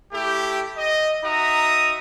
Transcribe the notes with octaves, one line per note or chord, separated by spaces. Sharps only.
A3 E4 G4
D#5
D#4 F#4 E5 A#5 D#6